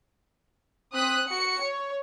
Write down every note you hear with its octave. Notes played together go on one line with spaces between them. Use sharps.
C4 D#6 F#6 B6
F#4 C#7
C#5